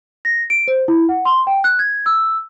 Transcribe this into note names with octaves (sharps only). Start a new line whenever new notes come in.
A#6
D7
C5
E4
F#5
C6
G5
F#6
G#6
E6